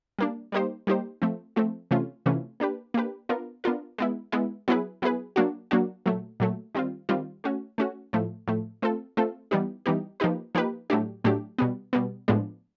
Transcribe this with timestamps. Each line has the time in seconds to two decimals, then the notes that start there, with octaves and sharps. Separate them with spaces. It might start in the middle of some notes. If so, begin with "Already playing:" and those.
0.19 G3 A#3 D4
0.52 G3 A#3 D#4 G4 C5
0.87 G3 A#3 D#4 G4 C5
1.22 F3 A3 C4
1.56 F3 A3 C4
1.91 C3 E3 A3 C#4 F4
2.26 C3 E3 A3 C#4 F4
2.60 A#3 D4 G4 B4
2.94 A#3 D4 G4 B4
3.29 B3 D4 F4 A#4
3.64 B3 D4 F4 A#4
3.98 G#3 B3 E4
4.32 G#3 B3 E4
4.68 F#3 B3 E4 G#4 B4
5.02 F#3 B3 E4 G#4 B4
5.36 F#3 A#3 D4 F#4
5.71 F#3 A#3 D4 F#4
6.06 A#2 F#3 A3
6.40 A#2 F#3 A3
6.75 D#3 G3 C4 F4
7.09 D#3 G3 C4 F4
7.44 A3 C#4 F#4
7.78 A3 C#4 F#4
8.13 A2 F3 A3
8.47 A2 F3 A3
8.82 A3 C4 F4 A4
9.17 A3 C4 F4 A4
9.51 E3 G3 B3 D#4 G4
9.86 E3 G3 B3 D#4 G4
10.20 F3 A#3 D#4 G4 B4
10.55 F3 A#3 D#4 G4 B4
10.90 A2 F#3 A3 D4 G4
11.24 A2 F#3 A3 D4 G4
11.58 B2 G3 B3
11.93 B2 G3 B3
12.28 A2 F3 G#3 B3 D4